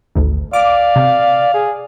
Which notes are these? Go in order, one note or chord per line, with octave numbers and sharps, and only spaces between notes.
G#1 D2
D5 F5 D6
C3
G#4